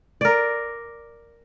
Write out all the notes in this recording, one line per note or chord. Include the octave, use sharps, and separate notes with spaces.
A#4 D5